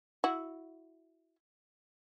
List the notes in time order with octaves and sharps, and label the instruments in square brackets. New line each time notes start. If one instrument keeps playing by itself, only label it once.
[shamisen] E4 F#4